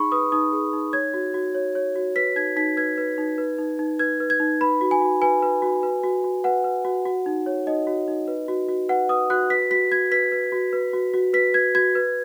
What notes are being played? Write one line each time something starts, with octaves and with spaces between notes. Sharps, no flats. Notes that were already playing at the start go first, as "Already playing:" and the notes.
Already playing: D#4 G#4 B5 C#6
B4 D#6
D#4 D#6
G#4
D#4
C#5 G#6
F#4
F#4
C#5
C#5
F#4
B4 B6
D#4 G#6
D#4 B6
B4 G#6
B4
D#4
B4
D#4
D#4
B4 G#6
B4
G#6
D#4
B4 B5
F#4
G#5
F#4
B4 G#5
B4
F#4
B4
F#4
F#4
B4 F#5
B4
F#4
F#4
D#4
C#5
D#4 D#5
F#4
D#4
B4
F#4
F#4
B4 F#5
B4 D#6
F#4 F#6
B4 B6
F#4 B6
F#4 G#6
B4 B6
B4
F#4
B4
F#4
F#4
B4 B6
B4 G#6
F#4 G#6
B4